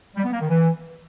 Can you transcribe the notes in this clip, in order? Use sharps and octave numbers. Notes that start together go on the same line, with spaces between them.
G3
B3
A#3
D#3
E3